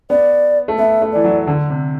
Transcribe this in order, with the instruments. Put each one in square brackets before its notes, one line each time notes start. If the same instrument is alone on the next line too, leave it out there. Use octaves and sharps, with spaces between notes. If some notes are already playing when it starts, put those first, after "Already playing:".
[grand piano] B3 [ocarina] D5
[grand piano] A3
[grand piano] B3 [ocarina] E5
[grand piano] A3
[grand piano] E3 [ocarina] D5
[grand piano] F#3
D3
C3